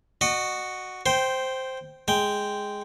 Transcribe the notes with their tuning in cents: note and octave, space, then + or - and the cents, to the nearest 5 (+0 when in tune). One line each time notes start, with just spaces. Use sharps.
F#4 +0 D#5 -35
C5 +0 G5 -10
G#3 +0 G5 +0